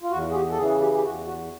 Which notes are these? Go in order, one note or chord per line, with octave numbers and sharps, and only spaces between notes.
F4
E2 F#4
G#4
G4
A4
C#3 E3 G#4
G4
G4
E2 F#4
F#4